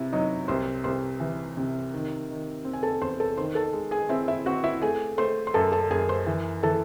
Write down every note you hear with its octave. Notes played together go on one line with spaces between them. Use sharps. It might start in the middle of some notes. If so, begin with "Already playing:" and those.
Already playing: C3 E4
F#3 D#4 D#5
C2 C5 C6
C2 C5 C6
E3
C3
D#3
D#3
C4
G#5
A4 A5
E2 C5 C6
A4 A5
D#3 C5 C6
A4 A5
G#3
G#4 G#5
C4 E4 E5
E4 E5
C4 F#4 F#5
E4 E5
A3 G#4 G#5
A3 C5 C6
C6
F#2 A4 A5
A4 A5
F#2 G#4 G#5
C5 C6
E3
E3 A4 A5